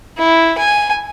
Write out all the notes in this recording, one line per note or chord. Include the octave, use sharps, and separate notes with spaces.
E4
G#5